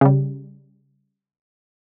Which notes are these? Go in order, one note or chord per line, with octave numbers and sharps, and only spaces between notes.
C#3 G3